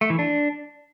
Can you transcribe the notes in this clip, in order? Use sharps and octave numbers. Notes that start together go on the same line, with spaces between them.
A3
E3
D4